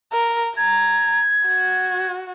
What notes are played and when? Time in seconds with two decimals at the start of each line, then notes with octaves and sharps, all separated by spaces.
0.13 A#4
0.57 A#5 G#6
1.47 F#4